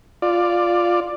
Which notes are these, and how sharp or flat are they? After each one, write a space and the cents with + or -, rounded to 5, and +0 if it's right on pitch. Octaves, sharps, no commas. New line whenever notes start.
F4 +0 D5 +10